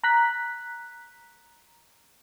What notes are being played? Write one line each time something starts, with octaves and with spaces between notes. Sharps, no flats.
A#5 F#6 B6